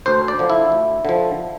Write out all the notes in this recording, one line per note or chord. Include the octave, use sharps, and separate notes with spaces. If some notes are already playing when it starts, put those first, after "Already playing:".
D2 C5
D5
D3 F3
E4
D2
D3 F3